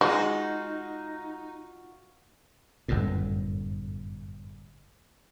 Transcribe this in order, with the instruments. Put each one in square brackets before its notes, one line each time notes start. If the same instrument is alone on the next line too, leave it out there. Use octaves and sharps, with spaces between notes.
[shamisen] G#3 [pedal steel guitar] D#4 [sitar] F4 F#4
[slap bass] G1 F#2 A2